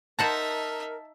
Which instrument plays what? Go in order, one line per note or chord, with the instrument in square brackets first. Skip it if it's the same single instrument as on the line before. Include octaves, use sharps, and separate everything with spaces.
[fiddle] D#4 E5 [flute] A#4 [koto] C5 F#5 A#5 [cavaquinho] A5